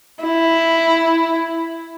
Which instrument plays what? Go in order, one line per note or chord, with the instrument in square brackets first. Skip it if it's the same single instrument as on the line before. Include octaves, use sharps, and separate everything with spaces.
[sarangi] E4